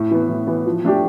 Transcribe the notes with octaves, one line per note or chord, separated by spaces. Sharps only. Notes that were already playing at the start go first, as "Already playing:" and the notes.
Already playing: A2
E3 B3
A2
E3 B3
F3
A3 D4 G4